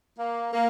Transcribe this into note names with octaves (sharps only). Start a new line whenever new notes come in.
A#3
A#3